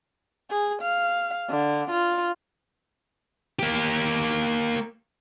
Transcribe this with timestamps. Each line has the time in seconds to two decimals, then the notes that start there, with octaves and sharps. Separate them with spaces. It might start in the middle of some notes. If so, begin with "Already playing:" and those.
0.50 G#4
0.82 F5
1.50 D3
1.91 F4
3.59 A#3 G4